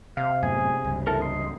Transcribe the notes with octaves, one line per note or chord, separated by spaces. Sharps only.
C3 F5
F#2 A2 B3 G#4 G#5
C#2 G2
E4 A4 A#4
D#5 C6